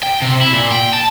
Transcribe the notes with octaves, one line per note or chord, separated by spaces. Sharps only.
G5
C3
E4
A#2
G5
A5